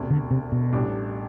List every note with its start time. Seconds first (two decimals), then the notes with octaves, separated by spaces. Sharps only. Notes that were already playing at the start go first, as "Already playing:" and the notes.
Already playing: E1 D2 C3
0.10 D3
0.31 C3
0.52 B2
0.72 A1 A2 G3 D4